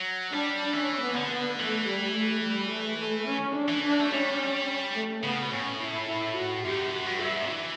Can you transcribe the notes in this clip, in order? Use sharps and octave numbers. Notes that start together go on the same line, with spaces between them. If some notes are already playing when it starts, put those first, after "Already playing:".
Already playing: F#3
G3 D4
E3 C#4
B3
D3
B3
E3 A3
G3
A3
G3
A3
A3
C#4
D4
E3
D4
A3
G3 C#4
A3
C#3 B3
B2
A2 C#4
E4
E4
F#4
F#2 G4
F#4
G2
E5
E3